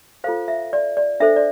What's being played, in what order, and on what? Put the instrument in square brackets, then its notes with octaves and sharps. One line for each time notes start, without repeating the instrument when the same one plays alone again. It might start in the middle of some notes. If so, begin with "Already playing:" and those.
[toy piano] F4 A4 C5 F5
E5
D5
D5
D4 A4 C5 E5
D5